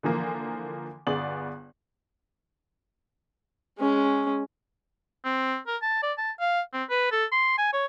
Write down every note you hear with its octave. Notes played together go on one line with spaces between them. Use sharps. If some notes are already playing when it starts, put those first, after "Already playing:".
D3 E3 F3 A#3
G1 B3 G#4 D5 F#7
G#3 C#4
C4
A#4
A5
D5
A5
F5
C4
B4
A4
C6
G#5
C#5